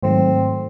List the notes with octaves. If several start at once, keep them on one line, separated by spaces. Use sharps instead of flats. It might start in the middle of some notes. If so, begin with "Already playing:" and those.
G#2 D#3 F#3 A3 C4